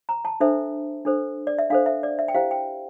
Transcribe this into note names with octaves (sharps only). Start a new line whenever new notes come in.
A#5
A5
D4 A4 C5 E5
D4 A4 C5
D5
E5
D4 A4 C5 F5
E5
D5
E5
G5
E4 G4 C5 F5
G5